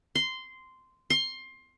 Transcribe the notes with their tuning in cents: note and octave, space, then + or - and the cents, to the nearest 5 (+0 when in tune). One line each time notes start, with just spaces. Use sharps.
C6 -10
C6 +20